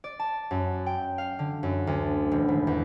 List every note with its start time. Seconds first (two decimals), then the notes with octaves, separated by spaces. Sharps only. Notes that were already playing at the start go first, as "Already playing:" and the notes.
0.04 D5
0.19 A5
0.51 F#2
0.86 G5
1.18 F5
1.39 D3
1.63 F#2
1.87 D2
2.32 E1
2.48 G#1
2.67 E2